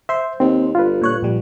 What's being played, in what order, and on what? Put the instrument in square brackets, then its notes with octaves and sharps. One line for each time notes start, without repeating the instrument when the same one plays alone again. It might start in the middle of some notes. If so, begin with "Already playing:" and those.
[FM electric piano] C5 [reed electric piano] E5 C6
[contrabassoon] D#2 [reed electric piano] C4
[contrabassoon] G1 [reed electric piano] F4 B4
[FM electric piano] A#2 C#5 F#6
A#1 G3